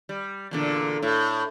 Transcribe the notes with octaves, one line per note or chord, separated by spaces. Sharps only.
G3
E2 A#2 D3
A2